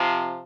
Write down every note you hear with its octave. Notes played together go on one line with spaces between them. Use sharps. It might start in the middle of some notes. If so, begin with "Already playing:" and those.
Already playing: C3 F3